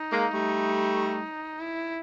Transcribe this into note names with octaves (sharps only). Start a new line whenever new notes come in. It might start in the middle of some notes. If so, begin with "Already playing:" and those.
Already playing: D#4
G#3 A#3
G3 A3
E4